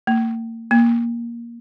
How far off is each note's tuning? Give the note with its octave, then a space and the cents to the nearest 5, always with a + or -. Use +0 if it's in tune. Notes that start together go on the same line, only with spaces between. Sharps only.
A#3 -35
A#3 +10